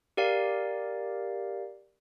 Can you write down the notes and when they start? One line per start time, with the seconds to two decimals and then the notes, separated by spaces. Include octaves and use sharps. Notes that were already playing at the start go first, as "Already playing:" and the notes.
0.17 G4 A#4 D5 F5